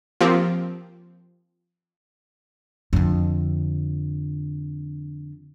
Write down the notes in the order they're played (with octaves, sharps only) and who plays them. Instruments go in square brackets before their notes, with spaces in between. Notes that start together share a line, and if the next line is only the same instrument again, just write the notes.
[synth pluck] F3 A#3 C4 G4
[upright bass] F2 D3